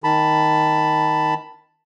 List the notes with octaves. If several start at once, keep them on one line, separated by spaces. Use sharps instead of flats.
D#3 A5 B5